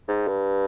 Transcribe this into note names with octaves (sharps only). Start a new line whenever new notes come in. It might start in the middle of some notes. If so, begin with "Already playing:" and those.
G#2
G2